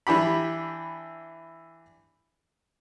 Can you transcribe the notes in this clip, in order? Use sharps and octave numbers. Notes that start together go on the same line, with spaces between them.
E3 D4 G4 B5